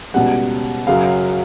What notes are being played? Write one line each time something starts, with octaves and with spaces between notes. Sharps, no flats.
C#2 B2 G3 F#5
F#2 C#3 F#3 F5